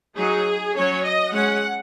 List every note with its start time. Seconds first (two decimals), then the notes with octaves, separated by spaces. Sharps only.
0.16 F#3 D#4 G#4
0.76 F#3 C#4 C#5
1.05 D#5
1.33 G#3 C#4 F#5